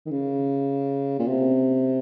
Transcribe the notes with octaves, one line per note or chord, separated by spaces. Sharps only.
D#3
C#3
A#2
C3